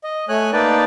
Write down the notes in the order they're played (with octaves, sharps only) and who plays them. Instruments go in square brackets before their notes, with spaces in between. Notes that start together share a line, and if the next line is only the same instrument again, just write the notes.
[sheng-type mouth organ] D#5
A3 C#5 G#5 F#6
A#3 D#4 B4 D5 G5 A5